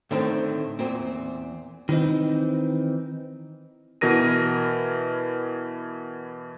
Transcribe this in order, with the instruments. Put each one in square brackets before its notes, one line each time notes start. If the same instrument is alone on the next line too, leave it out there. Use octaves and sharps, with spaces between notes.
[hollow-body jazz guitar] A2 D3 D#3 C4
E2 A#2 C4
[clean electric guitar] D#3 E3 C4 D#4
[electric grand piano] B2 E3 A#4 A#6 D#7